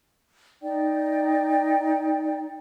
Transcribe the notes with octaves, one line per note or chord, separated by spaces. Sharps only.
D#4 D5 G5